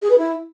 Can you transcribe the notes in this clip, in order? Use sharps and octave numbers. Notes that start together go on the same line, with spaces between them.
G#4
B4
E4